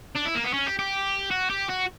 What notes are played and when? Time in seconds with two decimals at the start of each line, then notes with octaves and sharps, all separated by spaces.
0.15 D4
0.25 E4
0.35 A#3
0.44 B3
0.54 C#4
0.67 G4
0.79 G4
1.31 F#4
1.50 G4
1.69 F#4